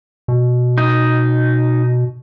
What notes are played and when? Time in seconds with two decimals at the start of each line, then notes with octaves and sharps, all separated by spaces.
0.28 B2
0.78 D#4